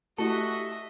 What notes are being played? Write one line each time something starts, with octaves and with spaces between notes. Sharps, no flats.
A3 E4 F#4 G4 A4 D#5 E5